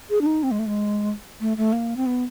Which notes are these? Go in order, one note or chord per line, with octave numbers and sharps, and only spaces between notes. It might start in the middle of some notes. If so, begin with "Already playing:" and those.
G#4
D4
D#4
C4
G#3
A3
G#3
A3
A3
A#3
C4
B3